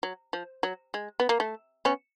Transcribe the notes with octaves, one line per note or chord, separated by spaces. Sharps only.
F#3
F3
F#3
G#3
B3
A#3
A3
B3 C#4